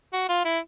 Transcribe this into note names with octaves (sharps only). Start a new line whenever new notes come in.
F#4
F4
E4